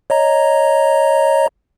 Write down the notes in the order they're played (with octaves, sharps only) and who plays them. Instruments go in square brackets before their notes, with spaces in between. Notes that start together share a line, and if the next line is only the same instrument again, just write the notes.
[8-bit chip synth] C#5 D#5 A#5